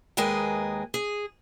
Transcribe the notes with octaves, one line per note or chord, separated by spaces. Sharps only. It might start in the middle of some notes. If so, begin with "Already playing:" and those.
D#2 G#3 G#4 A#4 B4 G5
G#4